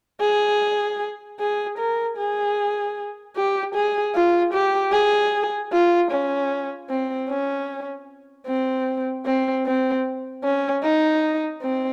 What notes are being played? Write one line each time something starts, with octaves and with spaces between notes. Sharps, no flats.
G#4
G#4
A#4
G#4
G4
G#4
F4
G4
G#4
F4
C#4
C4
C#4
C4
C4
C4
C#4
D#4
C4